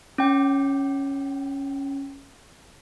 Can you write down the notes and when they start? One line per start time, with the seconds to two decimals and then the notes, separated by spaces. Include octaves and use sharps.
0.18 C#4 G5